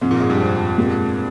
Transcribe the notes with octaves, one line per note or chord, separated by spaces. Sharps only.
G#2 C3 F3 G#3 C4
A#2 A#3
G#2 G#3
G2 G3
F2 F3
A#2 G#3 C4 G4 A#4